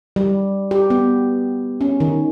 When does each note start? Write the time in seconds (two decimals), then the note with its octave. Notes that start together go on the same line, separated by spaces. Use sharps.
0.16 G3
0.71 G4
0.90 B3
1.81 C#4
2.00 D#3